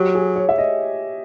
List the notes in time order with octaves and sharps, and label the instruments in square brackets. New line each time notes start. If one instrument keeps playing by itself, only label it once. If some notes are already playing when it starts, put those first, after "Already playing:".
Already playing: [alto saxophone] F#3 [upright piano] G4
[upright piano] G#4
C#5
E5
D#5